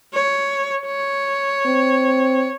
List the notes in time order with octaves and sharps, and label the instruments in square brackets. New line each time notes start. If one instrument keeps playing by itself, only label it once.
[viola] C#5
C#5
[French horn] C4